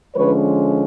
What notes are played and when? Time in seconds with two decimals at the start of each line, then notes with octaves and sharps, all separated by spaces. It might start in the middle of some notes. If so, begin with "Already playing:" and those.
0.16 D3 F3 G#3 C#4 B4 C#5